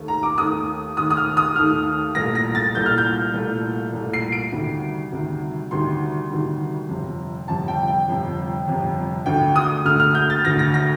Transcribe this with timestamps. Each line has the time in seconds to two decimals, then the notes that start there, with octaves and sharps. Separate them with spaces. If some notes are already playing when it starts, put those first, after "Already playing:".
Already playing: D#2 D#3 A3
0.08 A#5
0.23 D6
0.38 D#2 D#3 A3 D#6
0.97 D#2 D#3 A3 D#6
1.10 D#6
1.17 F6
1.37 D#6
1.56 D#2 D#3 A3 F6
2.15 C2 A#2 A3 A#6
2.35 A#6
2.55 A6
2.75 C2 A#2 A3 G6
2.86 F6
2.98 G6
3.34 C2 A#2 A3
3.93 C2 A#2 A3
4.13 C7
4.32 D7
4.52 D2 C3 D#3 G3
5.12 D2 C3 D#3 G3
5.71 D2 C3 D#3 G3 C6
6.30 D2 C3 D#3 G3
6.89 G1 F2 C3
7.48 G1 F2 C3 A5
7.68 G5
7.87 G5
8.08 G1 F2 C3
8.67 G1 F2 C3
9.26 D2 D3 A3 G5
9.56 D#6
9.85 D2 D3 A3 F6
10.00 F6
10.15 G6
10.30 A6
10.45 D2 D3 A3 A#6
10.59 A#6
10.74 A#6